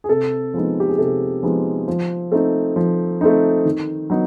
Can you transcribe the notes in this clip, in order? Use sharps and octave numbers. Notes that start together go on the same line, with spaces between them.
G#4
C3 A4
F3 G#3 B3 D#4
G4
G#4
C3 A4
F3 G#3 B3 D#4
F3
A3 C4 D#4
F3
A3 C4 D#4
D#3
F#3 B3 D#4